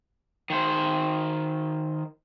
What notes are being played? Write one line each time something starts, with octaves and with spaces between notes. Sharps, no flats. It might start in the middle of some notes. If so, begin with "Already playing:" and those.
D#3 C5